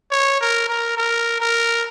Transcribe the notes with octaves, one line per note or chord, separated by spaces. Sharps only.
C#5
A#4
A#4
A#4
A#4